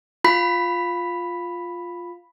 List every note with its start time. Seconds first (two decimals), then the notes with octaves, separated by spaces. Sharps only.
0.24 F4 B5 B6